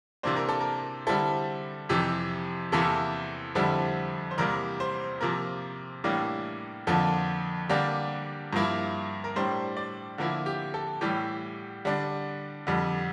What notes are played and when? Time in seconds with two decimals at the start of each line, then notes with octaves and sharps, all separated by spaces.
0.23 C3 E3 A#3 D4 C5
0.36 A#4
0.49 A4
0.60 A#4
1.07 D3 G3 C4 E4 A4
1.89 F2 C3 E3 G4
2.72 E2 C3 E3 A#3 E4 A4
3.55 F2 D3 G3 C4 E4 A4
4.31 C5
4.38 E2 C3 G3 A#3 A#4
4.80 C5
5.21 C3 F3 A#3 A#4
6.04 A2 E3 G3 A#3 D4
6.87 F2 D3 F3 A#3 A4
7.69 D3 G3 A#3 D4 G4
8.53 G2 F3 A#3 E4
9.24 A#4
9.36 A2 G3 D4 C5
9.77 D5
10.18 D3 F3 A#3 E4
10.46 G4
10.74 A4
11.01 A2 E3 G3 G4
11.85 D3 G3 D4
12.67 F2 D3 G3